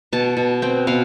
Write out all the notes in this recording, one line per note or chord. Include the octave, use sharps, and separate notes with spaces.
B2 A5
B2
C4 G5
B2 F5